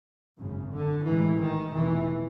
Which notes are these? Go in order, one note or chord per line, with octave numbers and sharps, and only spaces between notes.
G#1 F#2 C#3
D3
A1 G#2 E3
D#3
F1 E2 B2 E3